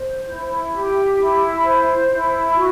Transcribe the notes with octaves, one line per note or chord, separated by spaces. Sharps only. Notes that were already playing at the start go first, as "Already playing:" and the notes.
Already playing: C5
E4
G4
E4
C5
E4
F#4